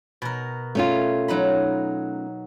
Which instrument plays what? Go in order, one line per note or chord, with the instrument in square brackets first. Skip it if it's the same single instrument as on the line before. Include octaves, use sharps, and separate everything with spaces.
[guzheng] B2 A#4
[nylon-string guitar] A3 C#4 F4
[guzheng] F#3 D#4 B5